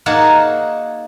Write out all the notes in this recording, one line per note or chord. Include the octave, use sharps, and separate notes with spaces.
A#3 D#4 F#4 G#4 F#5 A5